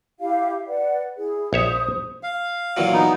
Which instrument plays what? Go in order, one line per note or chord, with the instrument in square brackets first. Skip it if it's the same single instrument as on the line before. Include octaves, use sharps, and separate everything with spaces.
[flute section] E4 G4 F5
B4 D5 F#5
E4 G#4
[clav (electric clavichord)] A#1 C#5 E5 [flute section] C5 D#6
[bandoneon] F5
[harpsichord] A#2 E3 F#3
[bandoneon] B3 D#4